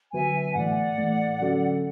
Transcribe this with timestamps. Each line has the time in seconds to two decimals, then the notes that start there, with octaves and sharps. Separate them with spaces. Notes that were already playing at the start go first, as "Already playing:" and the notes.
0.12 D3 F#3 B3 F#4 B4 E5 G#5
0.55 A2 E3 A3 D5 F#5
0.98 A2 E3 A3
1.40 D3 F#3 C#4 F#4 A4